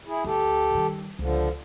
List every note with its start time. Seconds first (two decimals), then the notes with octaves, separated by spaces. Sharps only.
0.06 E4 G#4
0.24 D2 D3 G4 A4
0.74 D#3 G3
1.19 C#2 D3 F3